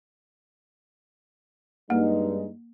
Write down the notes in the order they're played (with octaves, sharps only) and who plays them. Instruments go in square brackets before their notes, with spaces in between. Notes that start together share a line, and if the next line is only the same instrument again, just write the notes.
[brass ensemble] G2 G#3 D#4 [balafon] A#3